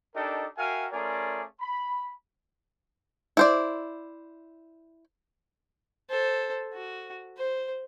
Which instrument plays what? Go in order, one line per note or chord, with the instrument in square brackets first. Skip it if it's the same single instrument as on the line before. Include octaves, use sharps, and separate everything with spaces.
[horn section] D4 D#4 G4 A4 A#4 D#5
F#4 A#4 E5 F5 G5 G#5
A3 C#4 F4 G#4 A#4 D5
B5
[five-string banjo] E4 C5 D5
[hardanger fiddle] A4 C5
F#4
C5